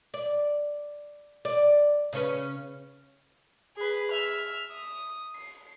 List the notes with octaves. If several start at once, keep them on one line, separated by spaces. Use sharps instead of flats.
D5
D5
C#3 C#4 B4
G#4 B4
E5 F6
D#6
C7